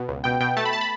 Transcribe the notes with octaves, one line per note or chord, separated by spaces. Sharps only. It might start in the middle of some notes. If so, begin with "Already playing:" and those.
Already playing: B2
C#2
B2 G5
B2 G5
A3 A5
B5
A5
B5